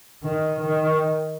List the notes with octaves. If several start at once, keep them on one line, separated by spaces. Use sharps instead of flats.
D#3
D#3